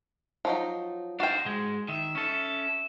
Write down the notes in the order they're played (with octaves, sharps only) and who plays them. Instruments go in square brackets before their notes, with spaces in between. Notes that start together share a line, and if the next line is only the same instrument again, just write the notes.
[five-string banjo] F3 F#3 D#4
[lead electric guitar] D4 C5 [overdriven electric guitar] D#4 F5 [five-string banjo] F#4 G5
[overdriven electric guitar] B1 G#2 [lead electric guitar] G#3
[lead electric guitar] D#3 [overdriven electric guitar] E5
[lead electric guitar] C#4 A4